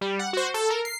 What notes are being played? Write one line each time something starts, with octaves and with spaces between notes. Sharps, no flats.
G3
F#5
F#4 C5
A4
A#4
C7